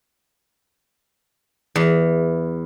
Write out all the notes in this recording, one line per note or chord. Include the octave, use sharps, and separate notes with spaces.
E2